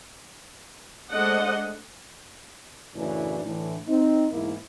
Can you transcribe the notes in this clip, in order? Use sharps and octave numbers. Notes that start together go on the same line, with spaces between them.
G#3 A3 D4 C5 D#5 F#5
F#2 A2 C#3 E3 A3 D4
A2 D3 E3
C4 D#4
E2 G#2 A#3 E4